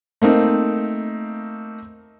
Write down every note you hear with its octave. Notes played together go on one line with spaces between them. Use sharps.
A3 A#3 C4 D#4